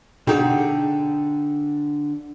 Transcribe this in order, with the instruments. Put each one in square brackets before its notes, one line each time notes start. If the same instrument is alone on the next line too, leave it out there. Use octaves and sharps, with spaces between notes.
[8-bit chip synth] B2 D#4 [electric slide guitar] D3 [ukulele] G4 G#4 F#5